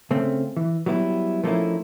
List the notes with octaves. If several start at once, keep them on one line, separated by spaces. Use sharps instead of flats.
C#3 A3 C4
E3
F#3 G3 B3 E4
F3 A3 A#3 C#4 D#4 E4